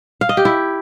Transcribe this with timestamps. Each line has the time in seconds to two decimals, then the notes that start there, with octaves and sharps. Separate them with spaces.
0.21 F5
0.29 D#5
0.37 G4
0.45 E4